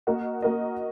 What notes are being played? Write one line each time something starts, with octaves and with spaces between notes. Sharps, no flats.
A#3 F#4 A#4 D#5
A#3 F#4 A#4 D#5